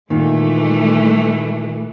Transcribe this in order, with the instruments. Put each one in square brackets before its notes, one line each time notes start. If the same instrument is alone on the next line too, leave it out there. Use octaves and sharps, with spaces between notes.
[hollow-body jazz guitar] A#2 D#3 [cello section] E3 G#3 A3